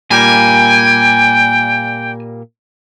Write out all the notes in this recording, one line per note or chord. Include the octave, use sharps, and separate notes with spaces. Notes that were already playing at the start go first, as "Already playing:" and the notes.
A#2 G3 A#3 G5 G#5